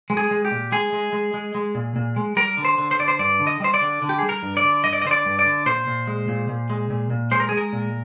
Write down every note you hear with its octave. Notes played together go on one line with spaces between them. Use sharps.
G#3
G#4
G#3
G4
A#2
G#3 G#4
G#3
G#3
G#3
G#3
A#2
A#2
G#3
G3 A#4
D3
C5
D3
C5
D3 D5
C5
G2 D5
D3
D#5
G3 C5
D5
D3
D3
G4
G3 G#4
A#4
G2
D5
D3
G2 D#5
D5
D#5
D3 C5
D5
G2
D5
D3
A#2 C5
A#2
G#3
A#2
A#2
G#3
A#2
A#2
G#3 C5
A#4
G#3 G#4
A#4
A#2